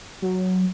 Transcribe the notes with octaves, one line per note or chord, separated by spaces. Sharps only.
F#3